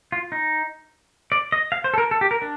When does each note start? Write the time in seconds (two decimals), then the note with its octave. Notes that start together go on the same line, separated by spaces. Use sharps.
0.12 F4
0.32 D#4
1.32 D5
1.52 D#5
1.72 F5
1.84 C5
1.94 A4
1.98 A#4
2.11 A4
2.21 G4
2.31 A#4
2.42 D4